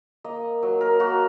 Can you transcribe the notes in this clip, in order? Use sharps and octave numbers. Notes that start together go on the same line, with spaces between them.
A#3 D#5
F#3
A#4
A#3 F#4